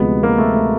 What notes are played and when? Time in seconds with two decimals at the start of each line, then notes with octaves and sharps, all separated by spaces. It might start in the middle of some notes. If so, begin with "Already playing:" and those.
Already playing: D2 C3 F3 G#3 B3
0.23 A#3
0.38 A3
0.54 A3